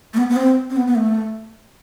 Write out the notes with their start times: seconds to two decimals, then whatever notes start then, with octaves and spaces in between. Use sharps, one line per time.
0.14 A3
0.17 B3
0.30 B3
0.36 C4
0.70 C4
0.76 B3
0.87 B3
0.95 A3